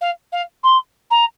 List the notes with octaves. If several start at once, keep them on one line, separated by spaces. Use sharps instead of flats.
F5
F5
C6
A#5